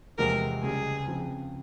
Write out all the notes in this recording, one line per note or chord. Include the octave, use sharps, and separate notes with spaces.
E2 C3 F3 G#3 C4 A#4
C#2 C#3 G3 G#4
C#3 F3 C4